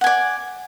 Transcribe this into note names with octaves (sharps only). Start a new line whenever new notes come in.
D5 F#5 G#5